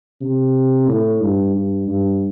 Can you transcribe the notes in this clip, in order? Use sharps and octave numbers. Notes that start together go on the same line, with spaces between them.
C3
A2
G2
G2
G2